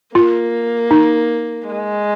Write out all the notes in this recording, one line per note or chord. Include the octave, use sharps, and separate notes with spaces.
A#3 F4
D#4
G#3